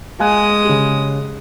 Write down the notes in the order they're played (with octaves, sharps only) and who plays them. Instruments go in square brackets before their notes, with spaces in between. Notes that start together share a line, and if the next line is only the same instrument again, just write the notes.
[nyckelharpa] G#3 D#6 [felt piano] F5 G#5 F#6
[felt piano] C#3 G4